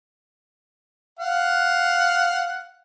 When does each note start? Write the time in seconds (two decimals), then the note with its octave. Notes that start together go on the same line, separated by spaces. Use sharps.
1.20 F5 F#5